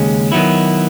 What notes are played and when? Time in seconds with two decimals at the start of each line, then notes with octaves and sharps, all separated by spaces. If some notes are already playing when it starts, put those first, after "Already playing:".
Already playing: D#2 C#3 G#3 C#4
0.32 D#3 F#3 B3 E4